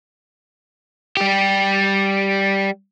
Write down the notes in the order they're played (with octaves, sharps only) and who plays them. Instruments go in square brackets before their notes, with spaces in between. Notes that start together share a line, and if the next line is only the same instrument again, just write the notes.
[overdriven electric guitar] G3 G4